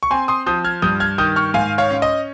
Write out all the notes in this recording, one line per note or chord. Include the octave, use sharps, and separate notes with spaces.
C#6
C4 G#5 C6
C6 D#6
F3 D#6 G6
F6 G#6
G2 D#6 G6
F6 G#6
D#3 D#6 G6
C#6 F6
G#2 F5 G#5
C#5 F5
C#4
D#5